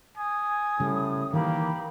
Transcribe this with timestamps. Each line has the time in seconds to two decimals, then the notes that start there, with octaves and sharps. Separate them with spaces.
0.17 G#5 D#6
0.80 A2 C#3 G3
1.33 D#3 E3 A#3 G4 B5